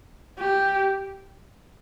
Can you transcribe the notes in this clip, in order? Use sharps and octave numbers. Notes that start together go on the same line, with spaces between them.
G4